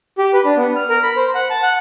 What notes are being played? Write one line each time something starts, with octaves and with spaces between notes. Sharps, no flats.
G4
B4
D4
B3
F6
A#4
B5
C5
F#5
A5
F#5